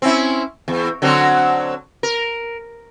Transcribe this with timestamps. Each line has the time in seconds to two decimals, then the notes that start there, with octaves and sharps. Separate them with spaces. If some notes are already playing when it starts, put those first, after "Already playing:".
0.02 C4 C#4 E4
0.68 E2
1.02 D3 F#3 C4
2.03 A#4